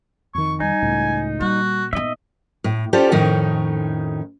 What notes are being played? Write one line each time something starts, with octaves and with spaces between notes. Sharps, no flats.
F2 D#3 C#6
G3 D#4 G#5
C#2 A2
A#2 G3 F#4
B3 D#4 D#5 E5
A2
C#4 F4 G4 A4 C5 D5
F2 A2 D#3 C#4 D#4